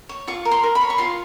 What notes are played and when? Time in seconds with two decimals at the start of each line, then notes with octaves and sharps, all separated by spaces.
0.09 C#5
0.27 F4 C#6
0.45 A#4
0.51 C6
0.63 A#4
0.75 B5
0.81 C#5
0.90 C#6
0.98 F4 C6